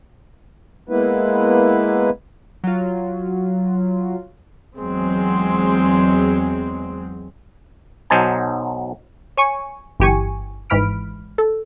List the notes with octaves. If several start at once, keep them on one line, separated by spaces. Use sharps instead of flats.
G#3 A#3 B3 E4 B4
F#3 F4
E2 F#3 G#3 C4
B1 F#3 D#4 C5 G#5 A5
C#5 G#5 C#6
G1 E3 G4 G#5 C#6
G#1 G#2 E3 B5 F6 D7
A4